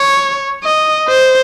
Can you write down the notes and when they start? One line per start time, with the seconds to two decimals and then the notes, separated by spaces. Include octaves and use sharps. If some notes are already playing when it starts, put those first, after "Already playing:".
Already playing: C#5
0.64 D#5
1.08 C5